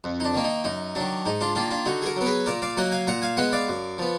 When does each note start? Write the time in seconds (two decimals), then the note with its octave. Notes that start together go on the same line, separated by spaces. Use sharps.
0.04 F2
0.20 D#4
0.25 D4
0.35 D#3 A#3
0.44 D#4
0.64 F#2 D#4
0.95 D#3 F#3 D4
1.26 G#2 D#4
1.41 D4 F4
1.55 D#3 A#3 D4 F4
1.71 D4 F4
1.85 D3 D#4 F#4
2.02 G#4
2.06 F#4 A#4
2.16 F#3 B3 A#4
2.26 G#4 B4
2.46 A#2 A#4 D5
2.62 D5 F5
2.77 F#3 A#3 D#5 F#5
2.92 F5 G#5
3.07 A#2 F#5 A#5
3.22 F5 G#5
3.37 G#3 B3 D#5 F#5
3.52 D5 F5
3.69 F#2
3.98 F3 B3